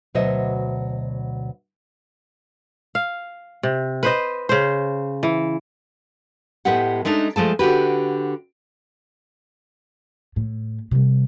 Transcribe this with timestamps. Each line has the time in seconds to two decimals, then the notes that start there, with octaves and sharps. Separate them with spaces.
0.15 D2 B2 F#3 C5 D#5 E5
2.95 F5
3.63 C3
4.03 B4 C5 D#5
4.49 C#3 C5
5.23 E3
6.65 A2 G#3 B3 G4 F#5
7.05 G#3 A3 D4 D#4
7.36 F3 G#3 A3 A5
7.59 D3 F#4 G4 B4
10.36 A2
10.91 C3 G3